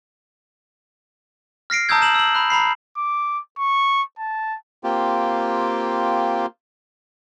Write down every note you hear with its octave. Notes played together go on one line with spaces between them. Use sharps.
F6 A#6 C7 D7
A5 A#5 D#6 E6 G6 G#6
A#5 E7 F#7
E6 F#7
B5 F#6
A#5 B5 C7
D6
C#6
A5
A#3 C4 F4 G4